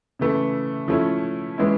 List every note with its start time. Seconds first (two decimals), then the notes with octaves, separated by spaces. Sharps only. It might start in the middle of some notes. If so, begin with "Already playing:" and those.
0.19 C#3 E3 A3
0.88 F3 A3 C#4 E4
1.58 E3 G#3 C#4 E4